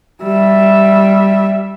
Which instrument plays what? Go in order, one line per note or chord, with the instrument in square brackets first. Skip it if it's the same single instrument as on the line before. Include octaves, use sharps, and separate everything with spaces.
[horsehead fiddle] G3 E5